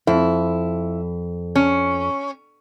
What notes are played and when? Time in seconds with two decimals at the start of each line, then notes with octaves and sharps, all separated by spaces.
0.07 F2 E4
1.56 C#4